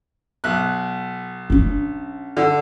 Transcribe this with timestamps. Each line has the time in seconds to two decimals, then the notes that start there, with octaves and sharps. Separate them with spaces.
0.44 B1 F#6
1.50 C#4 D4
2.37 D3